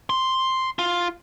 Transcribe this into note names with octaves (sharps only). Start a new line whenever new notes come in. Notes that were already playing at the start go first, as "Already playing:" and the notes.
C6
F4